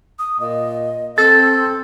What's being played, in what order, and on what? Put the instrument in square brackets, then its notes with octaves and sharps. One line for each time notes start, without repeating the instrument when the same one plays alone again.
[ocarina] D#6
[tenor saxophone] A#2 [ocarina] D#5
[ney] C4 [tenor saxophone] A4 [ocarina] E6 [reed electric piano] A6